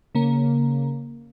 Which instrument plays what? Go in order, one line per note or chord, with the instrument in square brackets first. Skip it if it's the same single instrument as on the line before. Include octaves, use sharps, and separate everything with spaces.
[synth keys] C#3 A#3